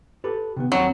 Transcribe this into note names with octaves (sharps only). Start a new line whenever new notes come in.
G4 A4 B4
C3 D#3 B3
D#2 F#3 C4 B5